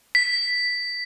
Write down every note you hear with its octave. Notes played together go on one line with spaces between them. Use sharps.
B6